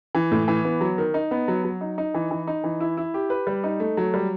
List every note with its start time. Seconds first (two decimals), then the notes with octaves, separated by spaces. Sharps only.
0.15 E3
0.32 A2
0.48 E3
0.65 B3
0.81 F#3
0.98 D#3
1.14 D#4
1.31 B3
1.48 F#3
1.64 F#3
1.81 D#4
1.98 D#4
2.14 E3
2.31 E3
2.47 D#4
2.64 E3
2.81 E4
2.97 E4
3.14 G4
3.30 B4
3.47 G3
3.64 D#4
3.80 A3
3.97 F#3
4.14 G3